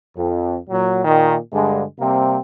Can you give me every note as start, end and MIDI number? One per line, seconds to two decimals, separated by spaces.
0.16 0.56 41
0.69 1.04 46
0.69 1.04 54
1.05 1.36 46
1.05 1.36 51
1.52 1.83 43
1.52 1.83 50
1.52 1.83 56
2.00 2.39 48
2.00 2.39 55
2.00 2.39 58
2.00 2.39 60